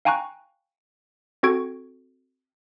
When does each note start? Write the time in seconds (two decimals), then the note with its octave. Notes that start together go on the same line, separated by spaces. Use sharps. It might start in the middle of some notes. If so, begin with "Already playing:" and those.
0.05 F5 G5 G#5 A#5 C#6 F#6
1.43 C4 F#4 A4 C#6 G#6 D7